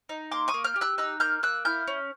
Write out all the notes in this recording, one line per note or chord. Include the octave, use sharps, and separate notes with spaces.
D#4
A#3 C6 D6
C#6 D#6
A#3
F6 G6
G4
E6 F#6
D#4 E6 F#6
A#3 F6 G6
A#3 E6 F#6
E4 F6 G6
C#4